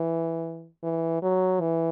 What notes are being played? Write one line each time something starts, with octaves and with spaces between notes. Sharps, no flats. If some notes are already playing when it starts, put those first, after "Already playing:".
Already playing: E3
E3
F#3
E3